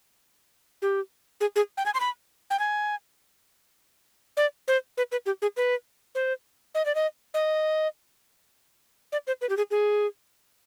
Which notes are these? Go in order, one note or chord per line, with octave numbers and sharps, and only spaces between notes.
G4
G#4
G#4
G5
G#5
C6
B5
G5
G#5
D5
C5
B4
B4
G4
G#4
B4
C5
D#5
D5
D#5
D#5
D5
C5
B4
G4
G#4
G#4